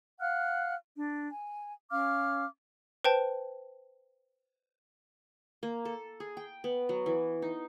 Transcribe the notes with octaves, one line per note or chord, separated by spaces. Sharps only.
F5 F#5 F6 F#6
D4
G#5
C#4 F5 D6 F6
B4 C5 G5 A5
A#3
A4
G#4
G5
B3
F#3
E3
D#4